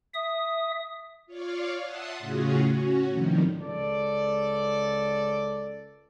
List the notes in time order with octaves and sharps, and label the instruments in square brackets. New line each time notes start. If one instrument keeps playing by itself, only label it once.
[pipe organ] E5 D#6
[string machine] F4 C#5 D5 F5
E5 F#5 A5 C6 D#6
A2 C#3 C#4 F4 F#4 G#4
C#4 F#4
A2 C3 D#3 F3 G3
[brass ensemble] C#2 A4 D5